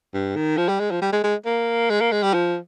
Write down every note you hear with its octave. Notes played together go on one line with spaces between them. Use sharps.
G2
D#3
F3
G3
G#3
F3
G3
G#3
G#3
A#3
G#3
A#3
G#3
G3
F3